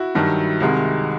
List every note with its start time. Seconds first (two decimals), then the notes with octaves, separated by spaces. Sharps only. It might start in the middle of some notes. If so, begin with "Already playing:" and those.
Already playing: E4 F#4
0.15 G2 D#3 F#3
0.60 C2 C3 D#3 G#3